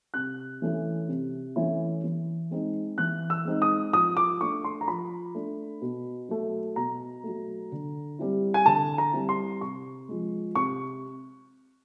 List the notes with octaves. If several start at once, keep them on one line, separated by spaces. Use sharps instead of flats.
C3 F#6
E3 A3 C#4 E4
C3
E3 A3 C#4 E4
E3
G#3 C4 D#4
E3 F#6
E6
G#3 C4 D#4
D#6
F3 D#6
D6
A3 D4 C#6
C6
A#5
F3 B5
A3 D4
B2
F#3 A3
B2 A#5
F#3 A3
D3
G3 C4 E4
G#5
D3 A5
A#5
G3 C4 E4
C6
C3 C#6
F3 G#3
C3 C#6